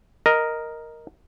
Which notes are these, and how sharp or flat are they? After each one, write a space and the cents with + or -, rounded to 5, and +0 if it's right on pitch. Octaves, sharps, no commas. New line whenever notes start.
A#4 +0 D#5 +0